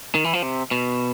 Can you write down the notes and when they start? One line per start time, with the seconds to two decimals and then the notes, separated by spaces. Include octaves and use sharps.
0.15 D#3
0.24 E3
0.33 F3
0.43 C3
0.71 B2